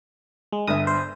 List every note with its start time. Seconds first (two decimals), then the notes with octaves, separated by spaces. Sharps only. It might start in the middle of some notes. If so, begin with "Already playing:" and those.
0.53 G#3
0.67 G1 G2 E5 D#6
0.87 C5